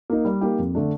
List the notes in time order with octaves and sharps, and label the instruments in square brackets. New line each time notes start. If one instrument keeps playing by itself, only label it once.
[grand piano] A#3 D#4
G3
A#3 D#4 G4
F2
D3 A3 D4